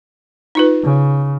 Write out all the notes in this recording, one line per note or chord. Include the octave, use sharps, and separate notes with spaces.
D#4 F4 B4
C#3